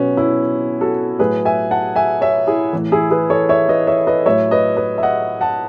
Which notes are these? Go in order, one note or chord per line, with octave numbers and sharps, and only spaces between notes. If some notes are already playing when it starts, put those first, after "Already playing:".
Already playing: B2 F#3 B3 C#4
C#4 E4
F#4 A4
A2 F#3 G#4 B4
E5 G#5
F#5 A5
E5 G#5
C#5 E5
E4 G#4
A2 E3
E4 G#4
G#4 B4
A4 C#5
C#5 E5
B4 D#5
C#5 E5
B4 D#5
A2 F#3 C#5 E5
B4 D#5
B4 D#5
E5
D#5 F#5
F#5 A5